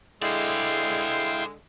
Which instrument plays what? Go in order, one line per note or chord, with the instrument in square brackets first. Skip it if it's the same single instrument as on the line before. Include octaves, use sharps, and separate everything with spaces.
[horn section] D3 G#3 [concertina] E4 F5 G5 [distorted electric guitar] C5 D5